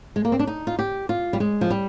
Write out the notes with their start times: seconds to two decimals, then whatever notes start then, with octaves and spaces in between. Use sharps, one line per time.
0.16 G#3
0.25 A#3
0.32 C4
0.39 D4
0.47 D#4
0.67 F4
0.79 G4
1.09 F4
1.33 G3
1.40 G#3
1.61 F3
1.70 G3